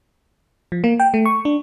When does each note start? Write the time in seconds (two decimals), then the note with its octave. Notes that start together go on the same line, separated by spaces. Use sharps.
0.72 F3
0.84 A#3
1.00 G5
1.14 A3
1.26 C#6
1.45 D4